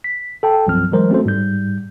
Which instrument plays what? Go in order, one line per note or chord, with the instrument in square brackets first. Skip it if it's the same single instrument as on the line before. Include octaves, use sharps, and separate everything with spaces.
[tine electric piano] B6
A4 G5 A5
C2 G2 F3 F#3 C4 F6
E3 F#3 G#3 A#4 C5
A3 C4 C#4 F#4 A4 C5
G#2 G3 G6